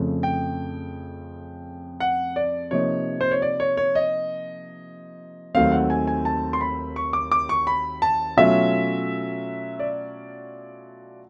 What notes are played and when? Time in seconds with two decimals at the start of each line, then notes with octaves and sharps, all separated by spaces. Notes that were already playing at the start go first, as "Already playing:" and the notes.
Already playing: F2 C#3 F3 A3
0.23 G5
2.00 F#5
2.36 D5
2.71 C3 F3 A#3 D#4 C#5
3.21 C5
3.31 C#5
3.42 D5
3.60 C#5
3.77 C#5
3.95 D#5
5.55 D#2 D#3 F#3 A3 C4 F5
5.72 F#5
5.90 G#5
6.07 G#5
6.25 A5
6.53 C6
6.61 B5
6.96 C#6
7.13 D6
7.32 D6
7.49 C#6
7.67 B5
8.02 A5
8.37 B2 F#3 A3 C#4 F4 E5
9.79 D5